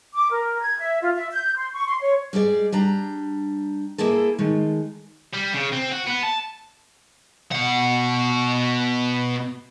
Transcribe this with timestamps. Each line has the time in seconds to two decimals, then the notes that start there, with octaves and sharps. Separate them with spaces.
0.14 D6
0.30 A#4
0.61 G#6
0.78 E5
1.02 F4
1.15 E5
1.32 G6
1.57 C6
1.73 C#6
1.87 C6
2.01 C#5
2.33 G3 G#3 G#4 D5
2.72 G3 D4 A#5
3.98 A#3 E4 G#4 A4
4.39 D#3 G#3 A3
5.34 G3
5.54 C#3
5.73 C4
5.92 F#4
6.07 B3
6.23 A5
7.52 B2 F#5